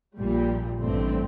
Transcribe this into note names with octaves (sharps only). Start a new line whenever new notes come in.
A#1 A#2 G3
A1 G2 D3 A3 C4